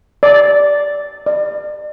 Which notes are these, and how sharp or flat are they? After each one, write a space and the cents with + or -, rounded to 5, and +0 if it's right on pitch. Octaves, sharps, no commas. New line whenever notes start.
D5 -10
D5 +35